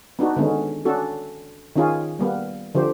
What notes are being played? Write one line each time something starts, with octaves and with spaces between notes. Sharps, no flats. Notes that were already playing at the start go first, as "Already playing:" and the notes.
B3 D4 D#4 F#4
D3 D#3 G#3 B3 C#4
C#4 D4 F#4 A4
D#3 C#4 F4 G#4
G3 A#3 B3
D3 F3 G4 C5